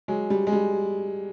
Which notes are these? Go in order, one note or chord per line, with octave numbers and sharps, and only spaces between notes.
F#3 G#3
G3
G#3
G3